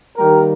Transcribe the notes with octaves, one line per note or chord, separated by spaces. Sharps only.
D#3 G3 A#3 G4 A#4